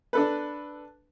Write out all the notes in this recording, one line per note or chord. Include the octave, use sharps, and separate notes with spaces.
D4 A4 B4